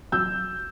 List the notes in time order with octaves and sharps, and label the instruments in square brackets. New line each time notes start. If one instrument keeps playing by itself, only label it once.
[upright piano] F#3 E6 G6